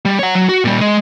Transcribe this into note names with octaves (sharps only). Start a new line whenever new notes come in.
G3
C#5 F#5
F#3
F#4
A#2 G3
G#3